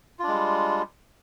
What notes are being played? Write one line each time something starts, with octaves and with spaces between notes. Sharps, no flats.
G3 G#3 D4 F4